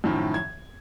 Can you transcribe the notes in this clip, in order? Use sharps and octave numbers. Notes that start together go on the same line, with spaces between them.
F#2 A2 D#3 F3
G#6